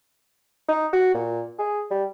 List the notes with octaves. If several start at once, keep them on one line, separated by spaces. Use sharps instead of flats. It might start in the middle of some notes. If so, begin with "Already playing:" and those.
D#4
F#4
A#2
G#4
G3